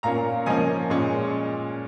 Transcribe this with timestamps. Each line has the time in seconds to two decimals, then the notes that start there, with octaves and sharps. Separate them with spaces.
0.03 A#2 A#3 C#4 F5 A#5
0.46 F3 A#3 C#4 D#5 G#5
0.90 A#2 G#3 C#4